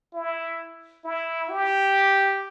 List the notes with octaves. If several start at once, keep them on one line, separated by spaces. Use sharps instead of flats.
E4
E4
G4